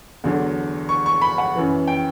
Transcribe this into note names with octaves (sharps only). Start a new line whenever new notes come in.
E2 D3 F#3
C#6
C#6
B5
F#5
F#2 E3
G5